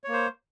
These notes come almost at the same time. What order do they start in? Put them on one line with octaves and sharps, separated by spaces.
C#5 A#3 C5